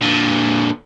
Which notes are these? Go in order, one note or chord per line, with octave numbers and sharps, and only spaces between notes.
A#2 D3